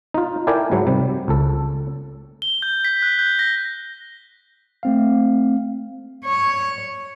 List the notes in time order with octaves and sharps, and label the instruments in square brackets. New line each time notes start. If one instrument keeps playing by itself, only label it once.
[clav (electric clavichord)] D#4 F4
E4 A4 A#4 D5 G5 G#5
G#2 F#3
C3 G3
C#2 A4
[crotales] G7
G6
B6
F#6
G6
A#6
[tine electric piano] A3 C4 F5
[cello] C#5